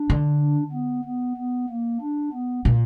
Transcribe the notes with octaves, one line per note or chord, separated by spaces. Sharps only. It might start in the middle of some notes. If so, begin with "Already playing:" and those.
Already playing: D4
D3
B3
B3
B3
A#3
D4
B3
A#2